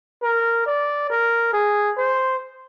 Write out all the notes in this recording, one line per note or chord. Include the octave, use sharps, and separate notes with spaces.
A#4
D5
A#4
G#4
C5